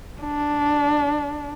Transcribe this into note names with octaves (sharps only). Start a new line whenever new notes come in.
D4